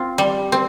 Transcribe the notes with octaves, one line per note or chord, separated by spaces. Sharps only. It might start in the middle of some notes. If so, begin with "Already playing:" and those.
Already playing: C4 F4
G3
C4